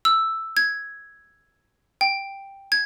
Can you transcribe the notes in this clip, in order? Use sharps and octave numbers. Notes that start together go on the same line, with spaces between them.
E6
G#6
G5
G#6